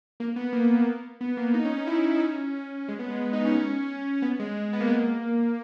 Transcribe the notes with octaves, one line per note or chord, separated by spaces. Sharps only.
A#3
B3
A#3
B3
A#3
D#4
C#4
D#4
E4
E4
D#4
C#4
G#3
B3
G#3
B3
D#4
C#4
B3
G#3
G#3
B3
A#3
G#3
A#3